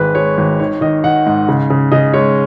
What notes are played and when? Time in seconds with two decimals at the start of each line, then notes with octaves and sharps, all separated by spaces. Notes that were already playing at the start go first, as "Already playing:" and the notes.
Already playing: G#1 G#3 B4
0.15 G#3 C#5
0.37 G#1
0.60 D#3 C#5
0.81 D#3 D#5
1.04 D#3 F#5
1.26 G#2
1.48 C#3
1.70 C#3
1.92 C#3 D#5
2.14 G#3 C#5